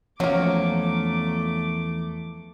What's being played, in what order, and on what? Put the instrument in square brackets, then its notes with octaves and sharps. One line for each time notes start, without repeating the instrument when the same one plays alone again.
[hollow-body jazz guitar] E2 C#4 [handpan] F3 [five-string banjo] F#3 A#3 [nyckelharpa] A3 D6